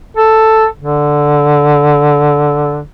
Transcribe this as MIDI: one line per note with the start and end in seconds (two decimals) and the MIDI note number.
0.17 0.67 69
0.79 2.81 50